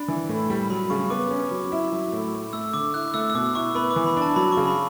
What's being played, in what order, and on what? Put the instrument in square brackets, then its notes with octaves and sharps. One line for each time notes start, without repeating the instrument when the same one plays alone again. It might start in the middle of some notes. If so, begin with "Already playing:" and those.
Already playing: [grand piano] D4 [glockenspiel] B5
[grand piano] E3
A2
G3
[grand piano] F#3 [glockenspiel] B5
[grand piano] C#3 [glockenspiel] C#6
[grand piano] B3 [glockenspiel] D6
[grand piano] C#4
F#3
E4
F#3
A2
A3
[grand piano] A3 [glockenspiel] E6
[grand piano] D3 [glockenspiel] D6
[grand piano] E4 [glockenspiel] F#6
[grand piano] A3 [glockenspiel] E6
[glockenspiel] E6
[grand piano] B2 [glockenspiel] D6
[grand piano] E4 [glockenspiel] C#6
[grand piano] B3 [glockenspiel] B5
[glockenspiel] D6
[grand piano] E3
[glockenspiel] B5
[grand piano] D4
[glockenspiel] A5
[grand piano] F#3 [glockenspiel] B5
[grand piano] C#3 [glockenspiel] C#6
[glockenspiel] B5